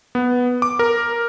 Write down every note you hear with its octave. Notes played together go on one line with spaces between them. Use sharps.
B3
D6
A#4